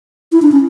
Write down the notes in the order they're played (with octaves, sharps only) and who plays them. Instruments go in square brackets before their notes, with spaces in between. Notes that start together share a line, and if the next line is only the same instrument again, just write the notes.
[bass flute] E4
D4
C#4